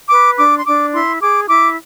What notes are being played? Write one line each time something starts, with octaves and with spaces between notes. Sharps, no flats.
B4 D6
D4 D6
C6
D4 D6
E4 C6
G#4 D6
E4 D6